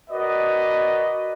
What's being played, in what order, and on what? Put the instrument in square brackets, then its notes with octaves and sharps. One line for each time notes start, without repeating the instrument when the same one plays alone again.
[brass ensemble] F#4 A#4 B4 D5 D#5